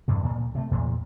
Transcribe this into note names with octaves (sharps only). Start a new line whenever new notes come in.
E2 G2 C3
D2 A#2
C3 A3
E2 A#2